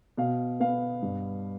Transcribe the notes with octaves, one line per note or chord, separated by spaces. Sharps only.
B2 F5
B3 F5
G2